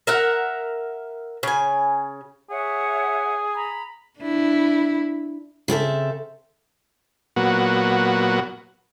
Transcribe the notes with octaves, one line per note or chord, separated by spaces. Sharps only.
A#4 E5 F#5
C#3 G#5
G#4 C#5 E5 F#5
A#5 B5
D4 E4
C#3 C4 A4 E5
A#2 F#3 B3 F#4